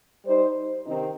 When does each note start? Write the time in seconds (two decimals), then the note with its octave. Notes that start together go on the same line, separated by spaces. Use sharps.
0.25 G3 D#4 C5
0.86 C3 D#3 C4 D#4